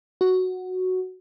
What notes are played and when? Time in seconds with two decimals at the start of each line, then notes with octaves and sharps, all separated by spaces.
0.21 F#4